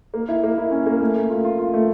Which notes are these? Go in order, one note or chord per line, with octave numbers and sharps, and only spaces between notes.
A#3
E4
A#3
E4
C#4
A#3
A3
A3
F4
F4
F4
A3